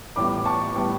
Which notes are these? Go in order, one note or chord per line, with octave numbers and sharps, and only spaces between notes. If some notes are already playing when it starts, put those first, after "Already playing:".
A1 A2 G3 B3 B5 D6
D6
A5 C#6
A2 G3 B3